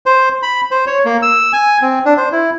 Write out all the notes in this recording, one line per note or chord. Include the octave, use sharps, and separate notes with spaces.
C5
B5
C5
C#5
A#3
E6
G#5
C4
D4
C5
E4